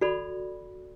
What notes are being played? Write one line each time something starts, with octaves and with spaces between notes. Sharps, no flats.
F#4 A4 D5 B5